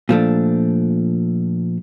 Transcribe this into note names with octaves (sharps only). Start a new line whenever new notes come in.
A#2 F3 A3 D4